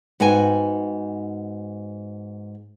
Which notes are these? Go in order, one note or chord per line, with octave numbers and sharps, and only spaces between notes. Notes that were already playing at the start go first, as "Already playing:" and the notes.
G#2 B3 F#4 G5 G#5